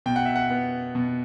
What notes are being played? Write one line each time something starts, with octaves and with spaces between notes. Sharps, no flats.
B2 G5
F#5
E5
F#5
B3
B2